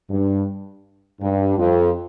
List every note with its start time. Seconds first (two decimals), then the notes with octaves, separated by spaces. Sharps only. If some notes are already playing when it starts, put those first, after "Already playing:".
0.10 G2
1.21 G2
1.57 F2